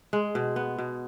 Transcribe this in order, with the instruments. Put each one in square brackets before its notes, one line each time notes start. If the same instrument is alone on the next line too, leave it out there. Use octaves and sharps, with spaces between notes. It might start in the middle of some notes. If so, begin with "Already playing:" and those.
[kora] G#3
B2
B3
B2